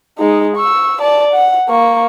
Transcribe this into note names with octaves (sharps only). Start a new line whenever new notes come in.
G#3 D#4
C#6 E6
D5 A5
F#5
A#3 C#6